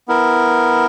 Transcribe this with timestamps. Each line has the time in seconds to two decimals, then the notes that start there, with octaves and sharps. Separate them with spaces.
0.08 B3 E4 A#4